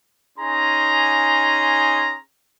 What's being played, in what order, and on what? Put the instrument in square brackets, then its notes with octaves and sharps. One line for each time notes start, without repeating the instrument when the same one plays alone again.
[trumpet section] C#4 D#4 G#4 A#5 C6